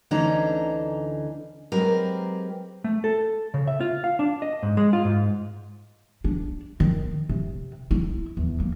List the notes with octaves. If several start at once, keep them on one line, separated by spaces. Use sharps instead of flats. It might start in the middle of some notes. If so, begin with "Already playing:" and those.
D2 D3 E3 C#4 D#4 A#5
F#3 G#3 C4 G4 A#4 B4
A3
A4
C#3
E5
F4
F5
D4
D#5
G#2
G#3
F4
G#2
D4
D#3
C3
E4
E2
A#3